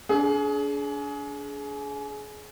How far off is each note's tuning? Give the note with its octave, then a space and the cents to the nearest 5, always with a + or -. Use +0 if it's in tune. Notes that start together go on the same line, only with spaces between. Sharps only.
D4 -35 G#4 +25